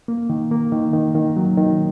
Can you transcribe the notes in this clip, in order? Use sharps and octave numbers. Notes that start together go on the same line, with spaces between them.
A#3
D#3
A#3
D#3
D#3
D#3
F#3
D#3